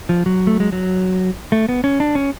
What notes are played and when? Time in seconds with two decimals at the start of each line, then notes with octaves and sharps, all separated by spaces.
0.09 F3
0.26 F#3
0.47 A3
0.60 G#3
0.72 F#3
1.52 A3
1.69 B3
1.84 C#4
2.00 D4
2.15 C#4